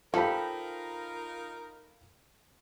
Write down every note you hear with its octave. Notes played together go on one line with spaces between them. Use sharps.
F3 D#4 F4 G4 A4 A#4 F5 B5